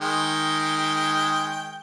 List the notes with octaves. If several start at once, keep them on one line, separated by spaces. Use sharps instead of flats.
D#3 G#3 G5